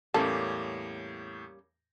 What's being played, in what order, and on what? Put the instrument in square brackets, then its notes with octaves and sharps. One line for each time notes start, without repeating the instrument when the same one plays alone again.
[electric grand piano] E2 A2 [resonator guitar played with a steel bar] G3 A#3 C#4 [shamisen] A4